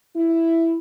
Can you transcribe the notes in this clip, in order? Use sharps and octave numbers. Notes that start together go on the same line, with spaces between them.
E4